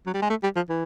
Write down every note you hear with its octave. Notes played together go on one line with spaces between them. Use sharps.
F#3
G3
G#3
A3
G3
F3
E3